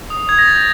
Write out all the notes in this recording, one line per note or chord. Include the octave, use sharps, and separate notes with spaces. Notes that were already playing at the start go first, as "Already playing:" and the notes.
D#6
D#6 G#6
A#6
G6 A6